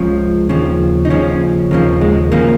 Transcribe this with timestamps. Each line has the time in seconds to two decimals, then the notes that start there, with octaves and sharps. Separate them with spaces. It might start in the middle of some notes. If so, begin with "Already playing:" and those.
Already playing: C#2 C#3 F3
0.49 D#2 C#3 F3
1.05 D#4
1.10 D#2 C#3 F3 C#4
1.71 D#2 C#3 F3 A#3
2.01 G#3
2.32 C#3 F3 A#3